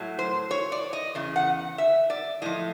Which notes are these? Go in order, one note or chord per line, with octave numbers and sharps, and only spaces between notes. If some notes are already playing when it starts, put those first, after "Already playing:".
Already playing: A2 F#3
C5
C#5
D5
D#5
E2 C#3
F#5
E5
D5
A2 F3 D#5